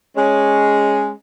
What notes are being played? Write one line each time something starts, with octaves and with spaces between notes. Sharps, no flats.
G#3 C#4